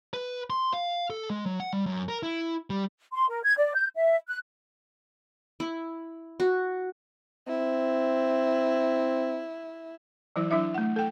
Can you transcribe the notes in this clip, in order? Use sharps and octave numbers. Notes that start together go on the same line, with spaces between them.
B4
C6
F5
A4
G#3
F#3
F#5
G3
F#2
A#4
E4
G3
C6
A#4
G#6
D5
G6
E5
F#6
E4
F#4
C4 E4
E3 F#3 E4 C5
F#3 D4 E4 E5
A3 F#5
A4 G5